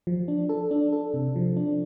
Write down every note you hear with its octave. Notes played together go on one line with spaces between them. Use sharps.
F3
D4
A4
D4
A4
C3
F3
D4